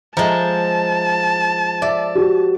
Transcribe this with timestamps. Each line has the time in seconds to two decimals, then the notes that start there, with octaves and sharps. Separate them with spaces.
0.17 F3 G#3 E5 A5 A#5
1.82 D5 E5
2.15 F#4 G4